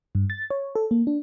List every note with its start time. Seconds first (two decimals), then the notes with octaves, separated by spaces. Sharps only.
0.15 G2
0.30 A6
0.50 C#5
0.76 A4
0.91 A#3
1.07 D4